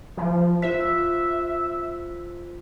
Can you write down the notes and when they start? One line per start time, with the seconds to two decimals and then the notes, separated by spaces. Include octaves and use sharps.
0.17 F3
0.62 F4 C5 E5 B6